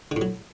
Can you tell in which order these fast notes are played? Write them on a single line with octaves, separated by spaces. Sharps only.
D3 A2 F#3